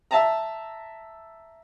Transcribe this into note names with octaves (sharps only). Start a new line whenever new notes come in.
E5 A5 A#5